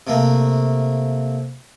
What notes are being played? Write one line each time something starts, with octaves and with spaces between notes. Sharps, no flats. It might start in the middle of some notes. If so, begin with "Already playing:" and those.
C3 A3 A#3